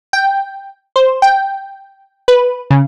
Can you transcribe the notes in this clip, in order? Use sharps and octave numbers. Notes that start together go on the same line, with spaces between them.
G5
C5
G5
B4
C#3